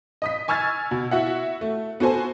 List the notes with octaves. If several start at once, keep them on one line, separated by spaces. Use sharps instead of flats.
D#5 D#6 B6
G#5 C#6 E6 F6 G#6 A6
B2
E4 F#4 E5 F#5
A3
B3 F#4 A4 C5 G#5